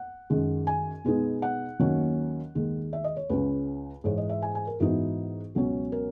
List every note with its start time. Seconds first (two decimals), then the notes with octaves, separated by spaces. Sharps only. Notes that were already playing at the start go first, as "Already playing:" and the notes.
Already playing: F#5
0.30 F#2 D#3 G#3
0.67 G#5
1.05 B2 G#3 B3 D#4
1.42 F#5
1.79 D#2 D#3 F#3 A#3 C#4
2.55 D#2 D#3 G#3
2.93 E5
3.04 D#5
3.17 C#5
3.29 C#2 C#3 G#3 C#4 B4
4.04 G#2 E3 G#3 C#5
4.18 D#5
4.29 E5
4.42 G#5
4.55 G#5
4.67 A#4
4.80 G#2 E3 B3 D#4 F#4
5.55 C#2 B2 F#3 C#4
5.92 A#4